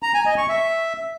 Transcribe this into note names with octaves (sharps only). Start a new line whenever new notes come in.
A#5
G#5
D#5
C#6
E5